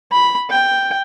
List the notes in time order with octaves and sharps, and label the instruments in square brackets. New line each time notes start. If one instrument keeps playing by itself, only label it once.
[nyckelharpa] B5
G5